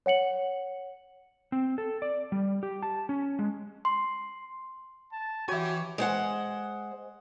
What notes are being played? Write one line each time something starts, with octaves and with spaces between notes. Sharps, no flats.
C#5 F#5 C#7 F#7
C4
A4
D5
G3
G4
A5
C#4
G#3
C6
A5
E3 F#4 G4 C#5 E5 G#5
G#3 C5 F#5